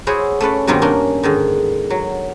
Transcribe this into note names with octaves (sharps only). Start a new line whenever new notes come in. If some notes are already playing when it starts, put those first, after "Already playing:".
E4 F#4 G#4 C5 C#5
A3 C#4 B4 D5
G2 B2 D#3 A#3 C4 D#4
A#3 C#4 D4 A#4
G#2 D3 D#3
F#3